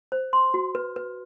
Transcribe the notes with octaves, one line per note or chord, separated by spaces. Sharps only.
C5
C6
F#4
B4
B4